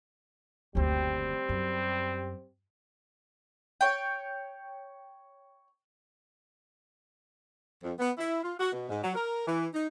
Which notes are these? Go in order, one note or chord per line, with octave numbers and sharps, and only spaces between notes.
F#1 D2 G3 C4 G4
F#2
C#5 G5
F2
B3
E4
F4
F#4
B2
G#2
F#3
A#4
E3
D#4